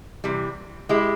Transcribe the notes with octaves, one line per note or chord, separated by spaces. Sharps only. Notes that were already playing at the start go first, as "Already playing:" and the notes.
C3 E3 G3
G#3 E4 G4